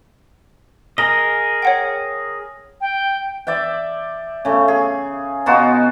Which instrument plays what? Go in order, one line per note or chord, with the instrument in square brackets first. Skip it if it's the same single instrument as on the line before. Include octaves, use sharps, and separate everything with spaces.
[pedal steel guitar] G#4 A#4 D#5 [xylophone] A#6
[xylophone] C#5 F#5 G5
[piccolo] G5
[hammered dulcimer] D5 E5 G5
C#3 A3
G#4
B2 D#4 F4 F#4